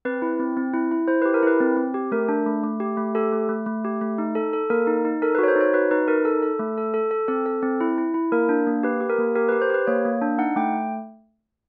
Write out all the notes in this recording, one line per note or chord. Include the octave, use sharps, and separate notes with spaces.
C4 B4
E4
C4
C4
E4
E4
E4 C5
G4 B4
A#4
E4 B4
C4
C4
G4
A3 A#4
D4
A3
A3
G4
A3
G4 A4
A3
A3
A3
G4
A3
D#4
A4
A4
A#3 A#4
D#4
D#4
A4 A#4
B4
F#4 C#5
C5
D#4
C#5
F#4 B4
D#4 B4
D#4 A#4
A4
A4
A3
A4
A4
A4
C4 A4
A4
C4
E4
E4
E4
A#3 A#4
D4
A#3
G4 B4
G4
A#4
A#3
G4 A#4
B4
G4
C5
G4 B4
A#3 C#5
A#3
D4
D#4 F#5
A3 G5